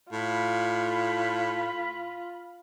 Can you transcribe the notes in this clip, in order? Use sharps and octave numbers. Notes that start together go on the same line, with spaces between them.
A2 F4 B5